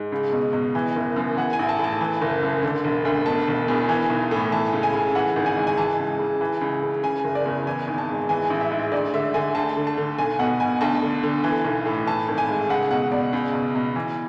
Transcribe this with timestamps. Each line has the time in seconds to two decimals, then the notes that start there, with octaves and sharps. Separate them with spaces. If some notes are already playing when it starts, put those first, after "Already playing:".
Already playing: G#2
0.12 C#2
0.32 B2
0.53 B2
0.75 E3
0.95 F#1
1.16 F#2
1.37 E3 F#5
1.53 G#5
1.59 A1
1.69 A5
1.79 A2
1.84 A5
2.01 E3
2.21 F#1
2.43 F#2
2.63 D3
2.84 E1
3.05 D2
3.26 B2 A5
3.47 E1
3.68 E2
3.89 E3
4.10 B1
4.31 A2
4.52 E3 A5
4.73 C#2
4.83 G#5
4.93 C#3
5.15 E3 F#5
5.36 G#1
5.46 G#5
5.57 G#2
5.67 G#5
5.77 E3 A5
5.99 C#2
6.19 C#3
6.41 E3
6.61 C#2
6.83 C#3
7.04 C#3 G#5
7.24 F#1
7.35 D5
7.46 E2
7.67 E3 G#5
7.87 G#1
7.98 A5
8.09 G#2
8.29 E3 G#5
8.50 A1
8.60 E5
8.72 G#2
8.92 D2 D5
9.13 D3 E5
9.34 D3 G#5
9.55 D2 A5
9.77 D3
9.87 A5
9.97 D3
10.18 B1 G#5
10.39 B2 F#5
10.60 B2 G#5
10.81 D2 A5
11.02 D3
11.23 D3
11.44 E3
11.64 B1
11.86 A2
12.06 E3 A5
12.28 G#1
12.38 G#5
12.49 G#2
12.69 C#2 F#5
12.91 B2 F#5
13.12 B2 D5
13.33 C#2
13.53 B2
13.75 B2
13.96 E3